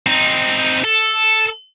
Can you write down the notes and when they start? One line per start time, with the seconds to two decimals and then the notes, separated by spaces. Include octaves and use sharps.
0.07 C4 D#4
0.84 A4